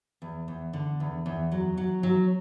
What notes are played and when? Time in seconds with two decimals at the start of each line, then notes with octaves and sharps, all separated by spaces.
0.22 E2
0.48 E2
0.73 D3
1.00 E2
1.26 E2
1.52 F#3
1.77 F#3
2.03 F#3